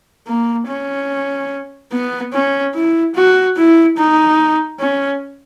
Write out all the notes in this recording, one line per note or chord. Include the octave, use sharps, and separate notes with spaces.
A#3
C#4
B3
C#4
E4
F#4
E4
D#4
C#4